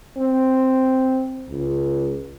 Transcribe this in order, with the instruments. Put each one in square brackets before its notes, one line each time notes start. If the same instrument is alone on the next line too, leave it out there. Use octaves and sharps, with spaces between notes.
[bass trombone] C4
C#2